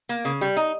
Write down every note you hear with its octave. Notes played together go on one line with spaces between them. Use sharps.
A#3
C#3
G3
D#4